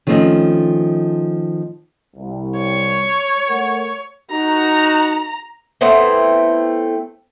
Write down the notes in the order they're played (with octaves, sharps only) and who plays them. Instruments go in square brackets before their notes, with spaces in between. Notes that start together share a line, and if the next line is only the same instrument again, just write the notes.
[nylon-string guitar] D#3 F3 A3 C4 C#4 D#5
[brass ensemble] C2
[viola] C#5
[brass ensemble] A3 A#4 F#5
[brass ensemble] D#4 F#4 [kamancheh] A#5
[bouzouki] A3 B3 C4 E4